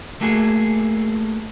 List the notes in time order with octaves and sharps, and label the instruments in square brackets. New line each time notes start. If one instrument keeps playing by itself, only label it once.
[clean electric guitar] A3 A#3 F#4 G#4